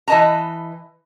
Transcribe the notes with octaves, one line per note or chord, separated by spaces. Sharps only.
E3 B4 D#5 A5 A#5